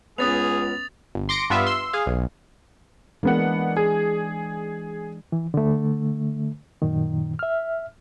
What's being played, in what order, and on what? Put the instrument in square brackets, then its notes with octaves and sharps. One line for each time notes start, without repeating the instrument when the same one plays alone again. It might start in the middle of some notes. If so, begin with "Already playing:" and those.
[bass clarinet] C#2 [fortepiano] B3 C#4 B4 [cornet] G#4 [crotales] D#6 A6 F7
[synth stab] G1
C6 D6 A#6 C#7 D7
G2 B3 F4 E5 F5
C6 E6
G#4 F5
B1
[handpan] E3 G#3 D4 [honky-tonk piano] A#3 B3 F#5
[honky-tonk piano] G#4
[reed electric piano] E3
D3 A3
F#2 A#2 D#3
E5 F6